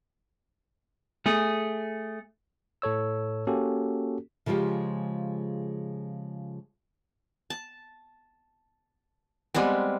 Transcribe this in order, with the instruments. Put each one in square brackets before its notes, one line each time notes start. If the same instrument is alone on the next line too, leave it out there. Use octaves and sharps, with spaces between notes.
[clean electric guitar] A3 G#4
[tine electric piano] A2 A4 C#5 E6
A#3 C#4 F#4 G4 A4
[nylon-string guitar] C#3 F3 G#3 F4 G4
[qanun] A5
G3 G#3 B3 C4